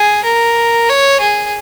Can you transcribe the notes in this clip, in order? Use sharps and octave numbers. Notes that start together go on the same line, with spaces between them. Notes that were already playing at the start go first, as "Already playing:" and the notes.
Already playing: G#4
A#4
C#5
G#4